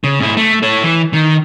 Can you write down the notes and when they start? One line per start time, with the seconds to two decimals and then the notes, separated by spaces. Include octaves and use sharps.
0.04 C#3
0.20 G#2 E4
0.37 A3
0.63 A4 C#5
0.83 E3
1.13 D#3